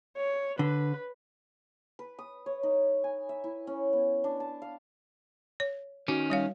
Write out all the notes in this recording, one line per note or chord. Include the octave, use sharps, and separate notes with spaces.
C#5
D3 B4
B4
D#6
C#5
D#4
G#5
E5
E4
C#4
B3
D4
A5
F5
C#5
D#3 C#4 F#4
G3 C#5 F5